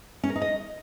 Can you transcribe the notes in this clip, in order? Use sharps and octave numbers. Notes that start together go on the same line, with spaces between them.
C#4
A#4
D#4
D#5